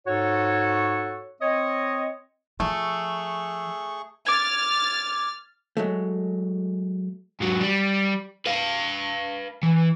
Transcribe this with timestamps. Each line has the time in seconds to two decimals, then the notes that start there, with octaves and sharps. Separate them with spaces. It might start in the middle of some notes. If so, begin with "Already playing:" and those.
0.07 G#2 F#4 A4 C#5
1.41 C4 C#5 D#5
2.60 F3 A3 G#4 C#6
4.27 D6 F6 G#6 A6
5.77 F#3 G#3 A3
7.41 G#2 F#3
7.61 G3
8.46 B4 F5
9.63 E3